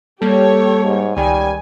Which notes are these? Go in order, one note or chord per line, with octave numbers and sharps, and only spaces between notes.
G3 A#3 G4 A4 C#5
G#2
C#2 D#3 G3 G#5